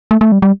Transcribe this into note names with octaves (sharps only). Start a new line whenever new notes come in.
A3
A3
G3
G3